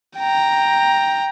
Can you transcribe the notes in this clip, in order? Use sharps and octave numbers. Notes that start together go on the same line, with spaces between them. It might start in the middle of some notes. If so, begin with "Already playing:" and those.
G5 A#5